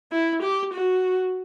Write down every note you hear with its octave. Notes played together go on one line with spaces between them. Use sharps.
E4
G4
F#4